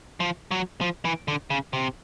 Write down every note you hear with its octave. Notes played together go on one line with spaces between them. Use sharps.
F3
F#3
F3
E3
D3
C#3
C3